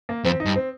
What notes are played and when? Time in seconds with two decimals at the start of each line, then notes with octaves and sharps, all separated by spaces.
0.09 A#3
0.24 F2 C4
0.40 D#4
0.46 G2
0.56 C4